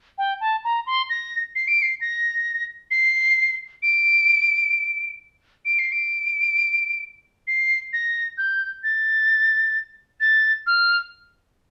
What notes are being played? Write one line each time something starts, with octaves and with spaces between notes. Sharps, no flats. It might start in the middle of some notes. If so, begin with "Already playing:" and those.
G5
A5
A#5
C6
A#6
C7
D7
C7
A#6
C7
D7
D7
C7
D7
C7
A#6
G6
A6
A6
F6